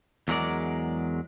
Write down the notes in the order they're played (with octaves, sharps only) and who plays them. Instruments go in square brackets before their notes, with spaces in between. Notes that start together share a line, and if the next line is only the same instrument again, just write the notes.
[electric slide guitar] E2 F#3 G#3 A#4 D5